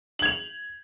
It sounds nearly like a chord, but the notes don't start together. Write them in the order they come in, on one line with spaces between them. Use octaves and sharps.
F#7 G#6 F7